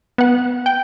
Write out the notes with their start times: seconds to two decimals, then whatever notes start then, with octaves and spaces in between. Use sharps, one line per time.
0.18 B3 F#5
0.66 G5